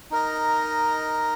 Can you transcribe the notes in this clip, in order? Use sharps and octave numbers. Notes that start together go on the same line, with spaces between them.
D#4 A#4 D#5